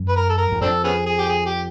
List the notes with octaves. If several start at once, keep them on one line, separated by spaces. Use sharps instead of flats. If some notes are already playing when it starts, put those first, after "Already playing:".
Already playing: F#2
B4
A#4
A4
A#4
E2
F2 C4 D4 A4
B3 C#4 G#4
G#4
G4
G#4
G4